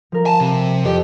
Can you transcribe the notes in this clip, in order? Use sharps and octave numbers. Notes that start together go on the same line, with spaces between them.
F3 A#4
G#5 A5
C3
F2 G4